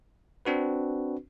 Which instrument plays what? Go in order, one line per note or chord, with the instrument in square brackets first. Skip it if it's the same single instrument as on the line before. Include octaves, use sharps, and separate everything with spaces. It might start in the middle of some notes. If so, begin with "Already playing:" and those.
[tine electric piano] C4 D4 F#4 B4